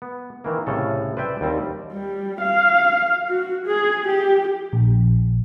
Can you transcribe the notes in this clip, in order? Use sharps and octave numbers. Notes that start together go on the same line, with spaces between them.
B3
D#3 E3 A#3
C2 A2 C#3 A4
B4 C5 D5 E5 G5
D#2 G3 C4
G3
F5
F#4
G#4
G4
A#1